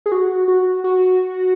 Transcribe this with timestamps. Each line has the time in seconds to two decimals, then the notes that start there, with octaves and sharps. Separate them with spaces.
0.06 G#4
0.12 F#4
0.48 F#4
0.84 F#4